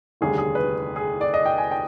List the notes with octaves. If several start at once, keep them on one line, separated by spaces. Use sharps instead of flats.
F1 D#2 D3 G3 G#4
G#4
B4
G#4
D5
D#5
G5
G#5
G5